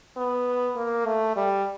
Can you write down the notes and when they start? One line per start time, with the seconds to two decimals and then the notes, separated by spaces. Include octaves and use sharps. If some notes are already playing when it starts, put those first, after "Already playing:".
0.17 B3
0.76 A#3
1.06 A3
1.36 G3